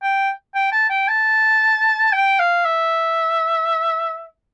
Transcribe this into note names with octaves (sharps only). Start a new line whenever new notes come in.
G5
G5
A5
G5
A5
G5
F5
E5